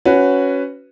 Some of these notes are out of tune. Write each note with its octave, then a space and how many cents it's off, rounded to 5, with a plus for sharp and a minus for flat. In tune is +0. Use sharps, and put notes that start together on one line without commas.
C#4 +0 F#4 +0 B4 +10